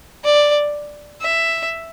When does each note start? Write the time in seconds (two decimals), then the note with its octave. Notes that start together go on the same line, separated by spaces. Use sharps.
0.24 D5
1.21 E5